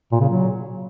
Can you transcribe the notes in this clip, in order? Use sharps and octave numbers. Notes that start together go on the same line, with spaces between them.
A#2
C#3
F#3